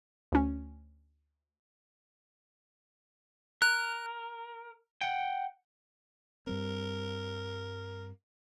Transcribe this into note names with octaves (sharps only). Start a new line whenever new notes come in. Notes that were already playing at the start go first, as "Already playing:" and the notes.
D2 C#4
A#4 F#6
F#5 G5
G2 G3 C4 A#4